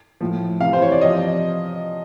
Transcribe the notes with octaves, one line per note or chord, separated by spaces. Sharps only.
A2 F3
C3 E3 F5
C5
C#5
D5
C3 F3 D#5